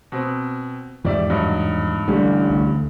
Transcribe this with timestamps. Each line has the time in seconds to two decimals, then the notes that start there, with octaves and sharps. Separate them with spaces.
0.12 B2 C4
1.04 E2 G#2 D#3 F3 G4 D5 E5
1.30 G2 F#3 D#4
2.08 A1 D3 G3
2.50 D2